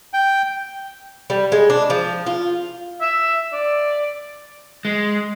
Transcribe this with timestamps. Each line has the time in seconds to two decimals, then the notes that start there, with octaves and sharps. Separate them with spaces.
0.14 G5
1.30 G3
1.52 G#3
1.70 D4
1.90 F3
2.27 F4
3.01 E5
3.52 D5
4.85 G#3